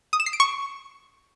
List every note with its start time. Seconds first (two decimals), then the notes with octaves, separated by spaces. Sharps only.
0.13 D#6
0.20 E7
0.26 C7
0.33 D7
0.40 C#6